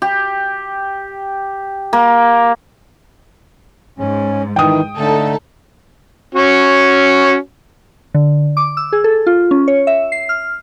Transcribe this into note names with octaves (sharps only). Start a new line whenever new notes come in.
G4
A#3
G#2 C#4
D#3 E3 G5 D#6
D3 A3 D#4 A4
C#4 F#4
D3
D6
E6
G#4
A4
F4
C#4
C#5
E5
C7
F6